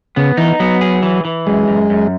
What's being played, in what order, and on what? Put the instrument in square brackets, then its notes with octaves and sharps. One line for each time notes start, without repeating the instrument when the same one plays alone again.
[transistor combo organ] C#3 [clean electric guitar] B3
[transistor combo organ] E3 [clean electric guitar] D#4
[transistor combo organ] F#3 [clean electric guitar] B3
[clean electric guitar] G#4
E3
E3
[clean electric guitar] F#2 [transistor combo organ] G#3
[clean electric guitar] F#2
F#2